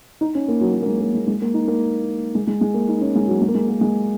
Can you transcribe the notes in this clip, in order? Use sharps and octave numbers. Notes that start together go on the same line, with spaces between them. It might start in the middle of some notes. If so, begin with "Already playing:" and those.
D#4
C#4
A#3
F#3
F#3
A#3
G#3
A#3
G#3
G#3
A#3
D#4
A#3
G#3
G#3
G#3
A#3
D#4
C#4
G#3
F#3
G#3
A#3
G#3
A#3
G#3